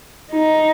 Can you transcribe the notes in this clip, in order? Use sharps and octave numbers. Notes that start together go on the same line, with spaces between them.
D#4